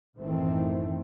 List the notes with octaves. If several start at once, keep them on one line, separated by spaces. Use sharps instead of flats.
A1 F#2 D#3 E3 A3 C4